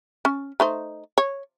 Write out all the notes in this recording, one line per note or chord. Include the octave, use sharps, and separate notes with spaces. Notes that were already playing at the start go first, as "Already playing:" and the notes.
C#4
A3 D#4 C5
C#5